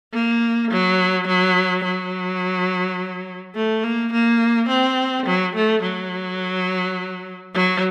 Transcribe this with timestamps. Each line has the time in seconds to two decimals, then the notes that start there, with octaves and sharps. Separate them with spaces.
0.14 A#3
0.71 F#3
1.28 F#3
1.84 F#3
3.55 A3
3.84 A#3
4.12 A#3
4.69 C4
5.26 F#3
5.55 A3
5.83 F#3
7.55 F#3